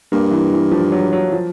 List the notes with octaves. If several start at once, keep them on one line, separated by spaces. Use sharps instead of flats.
G2 A#3
E3
E3
F3
F#3
F#3
F3